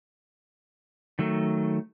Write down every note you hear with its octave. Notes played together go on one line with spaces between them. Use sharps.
D#3 F#3 A3